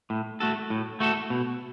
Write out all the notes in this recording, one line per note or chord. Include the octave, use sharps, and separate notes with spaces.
A2
A3 F#4 A4
A2
A3 F#4 A4
B2